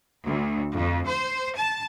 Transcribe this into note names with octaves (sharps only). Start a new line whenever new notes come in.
D2
F2
C5
A5